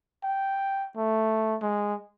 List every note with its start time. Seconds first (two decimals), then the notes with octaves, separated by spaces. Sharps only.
0.24 G5
0.97 A3
1.62 G#3